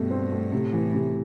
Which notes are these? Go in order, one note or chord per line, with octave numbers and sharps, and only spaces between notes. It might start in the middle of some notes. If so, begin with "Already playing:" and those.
Already playing: G2 B2 A3 G4
C4
A3
A2 C3
E3
C3